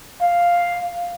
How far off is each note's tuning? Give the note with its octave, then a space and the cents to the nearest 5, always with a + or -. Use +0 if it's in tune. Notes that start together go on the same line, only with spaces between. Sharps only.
F5 +0